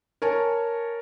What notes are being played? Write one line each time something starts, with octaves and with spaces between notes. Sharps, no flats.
A#4 C#5 G#5 A5